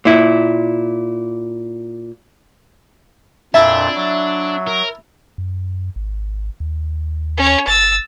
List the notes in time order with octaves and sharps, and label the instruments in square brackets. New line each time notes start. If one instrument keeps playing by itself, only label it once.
[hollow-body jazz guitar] A#2 E4
[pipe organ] F2 A#2 [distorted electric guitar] D4 [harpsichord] E4 A5 [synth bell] E5
[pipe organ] F#3
[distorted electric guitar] A#4
[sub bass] F#2
G#1
D#2
[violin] C#4 C#5
[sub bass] G1 [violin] E6 A6